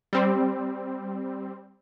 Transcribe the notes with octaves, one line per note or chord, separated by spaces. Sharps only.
G3 C4